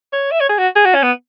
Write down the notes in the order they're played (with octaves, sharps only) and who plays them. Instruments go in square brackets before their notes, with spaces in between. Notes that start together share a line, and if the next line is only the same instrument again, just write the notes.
[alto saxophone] C#5
E5
C#5
G#4
F#4
G#4
F#4
C#4
B3